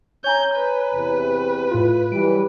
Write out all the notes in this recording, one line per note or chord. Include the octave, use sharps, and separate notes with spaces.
C#5 G#5 A#5 G6
B4
E2 C3
A2 F4
E3 F#3 G3 D7